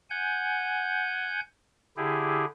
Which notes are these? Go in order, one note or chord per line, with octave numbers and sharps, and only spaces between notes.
F#5 G#5 G6
D3 E4 G4 G#4